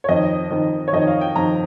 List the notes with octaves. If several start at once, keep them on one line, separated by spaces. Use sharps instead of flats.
C#5
F2 D#3 D#5
F2 D#3
C#5
F2 D#3 D#5
F5
G5
F2 D#3 A#5